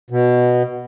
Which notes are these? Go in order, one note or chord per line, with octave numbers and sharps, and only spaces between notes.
B2